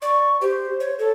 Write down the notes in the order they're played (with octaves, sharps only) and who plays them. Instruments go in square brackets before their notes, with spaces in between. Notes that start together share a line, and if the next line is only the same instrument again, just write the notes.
[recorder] D5 [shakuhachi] C#6
[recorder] G4 [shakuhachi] C5
[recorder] C#5
[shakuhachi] A4 [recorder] C#5